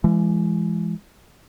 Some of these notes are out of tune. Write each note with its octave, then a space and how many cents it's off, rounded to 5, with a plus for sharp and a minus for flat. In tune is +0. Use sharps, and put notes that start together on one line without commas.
E3 +35 G#3 +0